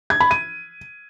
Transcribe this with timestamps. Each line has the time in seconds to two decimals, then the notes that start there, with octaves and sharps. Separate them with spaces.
0.10 G#6
0.20 B5
0.31 D#7